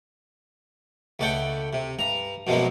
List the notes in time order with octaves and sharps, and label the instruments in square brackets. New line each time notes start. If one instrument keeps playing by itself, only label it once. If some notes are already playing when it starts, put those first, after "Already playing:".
[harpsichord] C#2 A3 D5 F#5 G5
C3
G2 A#5
F#2 B2 F3 F#3 G#3 A#3